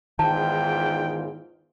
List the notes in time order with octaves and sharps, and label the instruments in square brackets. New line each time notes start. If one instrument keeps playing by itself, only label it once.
[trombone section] E2 G#2 F4 [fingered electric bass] D#3 [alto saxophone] G5 [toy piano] A5